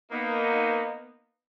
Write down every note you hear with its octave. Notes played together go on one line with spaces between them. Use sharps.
A#3 B3 D#4